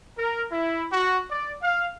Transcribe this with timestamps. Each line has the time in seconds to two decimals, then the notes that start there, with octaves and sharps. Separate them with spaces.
0.18 A#4
0.52 E4
0.92 F#4
1.31 D5
1.62 F5